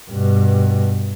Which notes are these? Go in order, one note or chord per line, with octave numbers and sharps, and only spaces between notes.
G2 B2